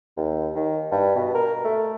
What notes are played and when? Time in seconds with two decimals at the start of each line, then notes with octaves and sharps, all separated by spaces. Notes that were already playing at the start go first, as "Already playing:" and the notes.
0.16 D#2
0.55 D#3
0.91 G2
1.15 B2
1.35 A#4
1.65 A3